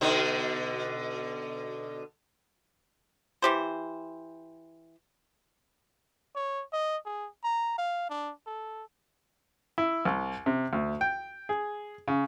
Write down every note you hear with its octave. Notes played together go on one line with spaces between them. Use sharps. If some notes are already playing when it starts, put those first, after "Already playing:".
B2 D3 D#4
E3 G4 C5
C#5
D#5
G#4
A#5
F5
D4
A4
E4
C2
C3
D2
G5
G#4
C#3